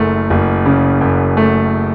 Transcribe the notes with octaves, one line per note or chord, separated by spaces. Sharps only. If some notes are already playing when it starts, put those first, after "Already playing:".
Already playing: F#1 F#2 C#3 A3
F#1
C#3
F#2
A3